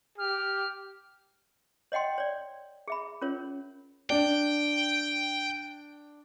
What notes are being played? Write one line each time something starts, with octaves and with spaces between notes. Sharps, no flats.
G4 F6
C#5 D#5 F#5 G5 C6
C#5 D5
G#4 E5 B5
C#4 F4 A#4 C#5
D4 G5